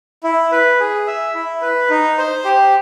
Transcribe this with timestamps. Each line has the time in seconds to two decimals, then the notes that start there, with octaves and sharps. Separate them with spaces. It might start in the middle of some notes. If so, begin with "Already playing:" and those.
0.24 E4
0.52 B4
0.80 G#4
1.07 E5
1.35 E4
1.62 B4
1.90 D#4
2.18 C5
2.45 G4